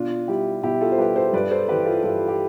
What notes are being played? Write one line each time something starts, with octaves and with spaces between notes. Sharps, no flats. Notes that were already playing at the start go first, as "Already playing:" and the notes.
Already playing: B2 D4 F4
G3 E4 G4
B2 E4 G4
F4 A4
C5
G3 G4 B4
A4 C5
G2 B4 D5
A4 C5
E3 G3 G4 B4
F4 A4
G2 F4 A4
G4